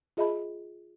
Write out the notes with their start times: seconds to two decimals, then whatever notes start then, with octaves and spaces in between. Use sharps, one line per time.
0.17 F4 G#4 D#5 E5 A5 B5